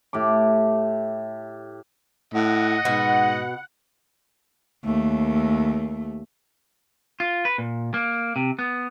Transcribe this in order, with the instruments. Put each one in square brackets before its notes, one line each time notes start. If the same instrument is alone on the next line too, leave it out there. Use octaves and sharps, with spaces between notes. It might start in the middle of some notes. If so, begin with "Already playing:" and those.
[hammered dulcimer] A2 G4 D6
[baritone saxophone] A2 [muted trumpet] D#5 [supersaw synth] F#5
[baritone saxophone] G#2 [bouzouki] B2 F#4
[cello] D#2 A3
[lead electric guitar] F4
B4
A#2
A#3
C3
B3